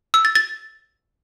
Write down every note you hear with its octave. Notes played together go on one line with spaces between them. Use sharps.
E6
A6
A6